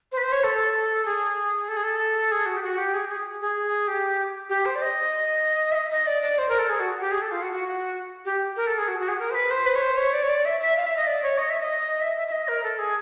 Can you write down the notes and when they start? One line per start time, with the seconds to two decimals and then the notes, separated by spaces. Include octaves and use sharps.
0.12 C5
0.17 B4
0.23 C5
0.32 C#5
0.44 A4
1.06 G#4
1.68 A4
1.77 G#4
1.83 A4
2.32 G#4
2.46 F#4
2.57 G4
2.63 F#4
2.78 G4
2.94 G#4
3.09 G#4
3.41 G#4
3.88 G4
4.49 G4
4.66 C5
4.76 D5
4.82 D#5
5.72 E5
5.75 D#5
5.91 D#5
6.07 D5
6.22 D5
6.38 C5
6.49 A#4
6.59 A4
6.69 G#4
6.80 F#4
7.00 G4
7.11 G#4
7.22 A4
7.31 F4
7.42 F#4
7.53 F#4
8.25 G4
8.57 A#4
8.67 A4
8.78 G#4
8.88 F#4
8.99 F#4
9.08 G#4
9.19 A#4
9.31 C5
9.34 B4
9.51 C5
9.66 B4
9.75 C#5
9.82 C5
9.97 C#5
10.13 D5
10.23 C#5
10.29 D5
10.45 E5
10.61 E5
10.76 F5
10.86 E5
10.97 D#5
11.07 D5
11.23 C#5
11.38 D#5
11.50 E5
11.60 D#5
12.01 E5
12.17 E5
12.27 E5
12.32 D#5
12.48 A#4
12.63 A4
12.79 G#4